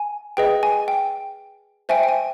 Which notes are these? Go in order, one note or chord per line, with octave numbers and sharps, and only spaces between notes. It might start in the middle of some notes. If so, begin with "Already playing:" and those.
Already playing: G#5
G#4 B4 D#5 G5
G#5
G5
C5 E5 G5 G#5
G5
G#5